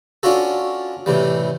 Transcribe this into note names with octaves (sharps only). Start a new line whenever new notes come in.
C#4 D4 F4 F#4 A4
A2 C3 E3 G3